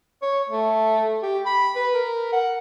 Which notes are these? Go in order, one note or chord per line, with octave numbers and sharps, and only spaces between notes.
C#5
A3
G4
B5
B4
A#4
F#5